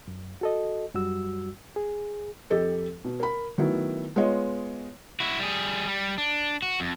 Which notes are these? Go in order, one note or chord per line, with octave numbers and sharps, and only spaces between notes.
F#2
F#4 A4 D#5
F#2 G3 F#4 E6
G#4
F2 G4 A4 D#5
B2
A#4 B5
D#3 F#3 A3 B3 E4
G#3 B3 F4 C#5 D#5
E4 F#4
G3 G#4
G3
D4
F#4
F2